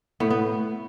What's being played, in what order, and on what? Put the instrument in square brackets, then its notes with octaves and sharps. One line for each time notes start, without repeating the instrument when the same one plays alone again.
[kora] A2 B3
B3